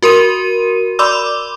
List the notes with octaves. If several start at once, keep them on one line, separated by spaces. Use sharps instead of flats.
F#4 A#4 C6 D#7
D5 B5 C6 D6 E6